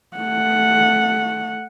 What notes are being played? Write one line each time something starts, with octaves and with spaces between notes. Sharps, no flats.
A3 F#5